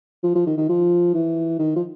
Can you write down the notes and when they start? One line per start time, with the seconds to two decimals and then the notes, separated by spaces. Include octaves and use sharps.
0.23 F3
0.35 F3
0.46 D#3
0.57 D#3
0.69 F3
1.14 E3
1.59 D#3
1.76 F3